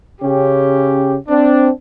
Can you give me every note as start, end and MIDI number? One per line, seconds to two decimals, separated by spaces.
0.21 1.15 49
0.21 1.15 61
0.21 1.15 67
1.28 1.68 60
1.28 1.68 62